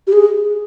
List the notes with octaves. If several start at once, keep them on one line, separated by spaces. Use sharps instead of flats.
G4
G#4